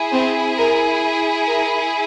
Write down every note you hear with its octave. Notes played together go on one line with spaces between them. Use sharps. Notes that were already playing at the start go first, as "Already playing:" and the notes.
Already playing: E4 G#4
C4 C5
A#4
A#4